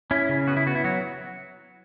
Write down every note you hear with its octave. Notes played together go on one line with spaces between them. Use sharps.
C#4 E4
C#3
B3 F#4
E4
B3 F#4
E4
F#3 F#4